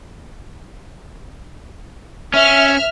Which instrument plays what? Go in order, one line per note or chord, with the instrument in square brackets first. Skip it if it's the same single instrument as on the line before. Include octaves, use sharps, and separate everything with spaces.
[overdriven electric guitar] C#4 [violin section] E5 F6